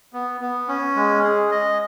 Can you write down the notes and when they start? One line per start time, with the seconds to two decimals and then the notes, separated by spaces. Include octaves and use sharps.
0.13 B3
0.41 B3
0.68 C#4
0.96 G#3
1.24 G#4
1.51 D#5